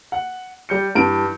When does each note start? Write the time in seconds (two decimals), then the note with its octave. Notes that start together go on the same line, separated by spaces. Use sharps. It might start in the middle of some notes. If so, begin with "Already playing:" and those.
0.12 F#5
0.69 G3 G6 C#7
0.95 G2 E3 D7